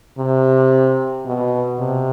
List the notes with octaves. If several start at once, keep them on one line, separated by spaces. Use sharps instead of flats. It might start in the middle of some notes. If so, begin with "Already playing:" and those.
C3
B2
C3